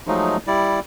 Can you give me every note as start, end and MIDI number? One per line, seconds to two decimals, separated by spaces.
0.07 0.37 53
0.07 0.37 54
0.07 0.37 56
0.07 0.37 57
0.07 0.37 63
0.47 0.80 55
0.47 0.80 64
0.47 0.80 74